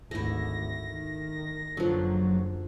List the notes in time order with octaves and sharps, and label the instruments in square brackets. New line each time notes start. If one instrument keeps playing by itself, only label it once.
[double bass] G#1 D2 [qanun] A3 E4 [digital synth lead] A#6
[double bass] D#3
[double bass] F#1 [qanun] D3 F3 [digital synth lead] F#3